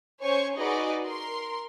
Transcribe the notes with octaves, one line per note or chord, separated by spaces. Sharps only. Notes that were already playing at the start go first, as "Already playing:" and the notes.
C#4 C5 C#5 G#5 C#6
D#4 F#4 G#4 B4 D5 D#5
A#4 C6